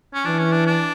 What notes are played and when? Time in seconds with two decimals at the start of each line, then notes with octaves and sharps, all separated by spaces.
0.14 C#4
0.25 E3 D4
0.39 C#4
0.52 D4
0.66 D4